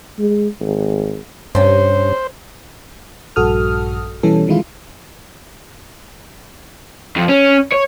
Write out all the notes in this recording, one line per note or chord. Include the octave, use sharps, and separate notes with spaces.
G#3
G#1
G2 C3 C#4 C5
A#1 G2 F#4 A4 D#6 F6
B2 E3 G3 C#4 A4
D#3 E3 G#3 E4 F4
F2
C#4
C#5